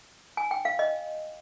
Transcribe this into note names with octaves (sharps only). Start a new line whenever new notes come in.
G#5
G5
F5
D#5